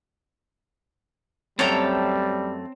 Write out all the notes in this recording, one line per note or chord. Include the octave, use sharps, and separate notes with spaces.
F#2 G3 A3 C4 C#5 G5 A5 A#5